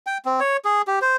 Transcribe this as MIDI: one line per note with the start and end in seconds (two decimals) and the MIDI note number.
0.07 0.18 79
0.25 0.40 60
0.40 0.57 73
0.65 0.82 68
0.87 0.99 67
1.02 1.17 72